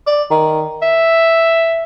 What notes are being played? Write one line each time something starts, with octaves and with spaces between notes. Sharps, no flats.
D5
D#3
E5